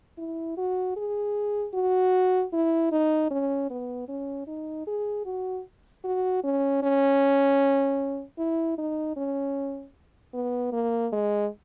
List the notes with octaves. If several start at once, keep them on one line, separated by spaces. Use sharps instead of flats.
E4
F#4
G#4
F#4
E4
D#4
C#4
B3
C#4
D#4
G#4
F#4
F#4
C#4
C#4
E4
D#4
C#4
B3
A#3
G#3